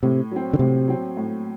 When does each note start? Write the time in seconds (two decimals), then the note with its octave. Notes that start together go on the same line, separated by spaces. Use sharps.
0.03 A2 C3
0.31 F#3 C4
0.53 D3
0.59 A2 C3
0.88 F#3 C4
1.17 A2